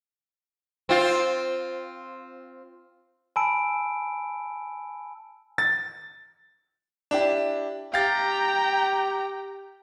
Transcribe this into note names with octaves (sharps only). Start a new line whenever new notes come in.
C4 F4
G#5 A5 B5 E6 D7
A6
D4 E4 G4
G4 F5 G5 A#5 A6